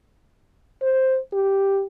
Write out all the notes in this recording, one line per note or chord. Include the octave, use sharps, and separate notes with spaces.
C5
G4